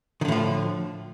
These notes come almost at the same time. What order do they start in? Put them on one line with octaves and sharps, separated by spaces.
D#3 D3 A2 F3